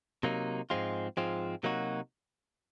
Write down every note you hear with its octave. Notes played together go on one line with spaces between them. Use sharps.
C3 F#3 A#3 D#4
G#2 F3 G#3 C4 F4
G#2 F3 G#3 C4 F4
C3 F#3 A#3 D#4 F#4